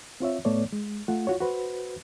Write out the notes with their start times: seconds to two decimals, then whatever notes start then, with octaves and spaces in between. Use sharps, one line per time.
0.20 C4 F4 C#5 E5
0.45 A2 A3 B3 C#5 D5
0.72 G#3
1.08 A3 F4 F#5
1.27 F4 F#4 C#5
1.41 F#4 B4 C5